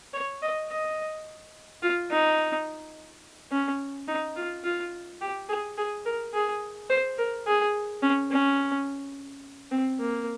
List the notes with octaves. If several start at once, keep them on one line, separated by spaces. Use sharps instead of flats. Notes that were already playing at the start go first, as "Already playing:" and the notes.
C#5
D#5
D#5
F4
D#4
C#4
D#4
F4
F4
G4
G#4
G#4
A#4
G#4
C5
A#4
G#4
C#4
C#4
C4
A#3